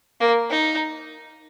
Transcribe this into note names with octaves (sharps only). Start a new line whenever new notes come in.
A#3
D#4